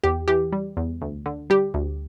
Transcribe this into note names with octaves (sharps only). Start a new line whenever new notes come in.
E2 G4
E3 G4
G3
E2
D2
D3
G3 G4
D2